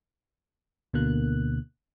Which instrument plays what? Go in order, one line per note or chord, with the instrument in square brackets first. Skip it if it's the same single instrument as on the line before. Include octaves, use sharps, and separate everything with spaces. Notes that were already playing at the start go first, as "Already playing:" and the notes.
[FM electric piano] D2 B2 D3 A#3 F#6